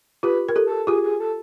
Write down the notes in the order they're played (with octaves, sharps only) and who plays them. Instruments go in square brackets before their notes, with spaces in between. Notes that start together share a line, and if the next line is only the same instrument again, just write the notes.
[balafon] F4 G4 [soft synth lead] B4
[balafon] A#4
G4 A4
[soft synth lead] A4
[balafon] F4 G4 [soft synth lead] G#4
[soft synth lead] G#4
A4